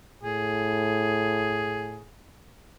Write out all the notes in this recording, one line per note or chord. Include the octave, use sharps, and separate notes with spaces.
A2 G#4